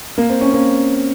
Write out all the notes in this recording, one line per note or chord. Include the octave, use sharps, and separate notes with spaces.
A#3
C4
C#4
A#3